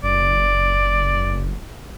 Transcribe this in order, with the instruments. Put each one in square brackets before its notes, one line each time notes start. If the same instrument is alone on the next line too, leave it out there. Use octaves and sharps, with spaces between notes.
[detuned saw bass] F#1 [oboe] D5